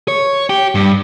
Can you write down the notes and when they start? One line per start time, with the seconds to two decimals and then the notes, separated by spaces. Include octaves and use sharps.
0.08 C#5
0.49 G4
0.75 G2